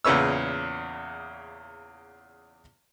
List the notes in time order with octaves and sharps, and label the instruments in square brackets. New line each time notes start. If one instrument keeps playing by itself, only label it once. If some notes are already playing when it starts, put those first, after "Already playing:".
[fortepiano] E2 A#2 C#3 B4 C#5 E6